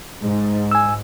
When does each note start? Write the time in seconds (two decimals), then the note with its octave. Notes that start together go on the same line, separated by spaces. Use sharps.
0.24 G#2
0.71 G#5 E6